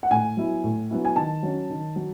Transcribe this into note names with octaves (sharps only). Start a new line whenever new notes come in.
F#5
A2 G#5
F#3 B3 E4
A2
F#3 B3 E4
G#5
D#3 A5
F#3 C#4
D#3
F#3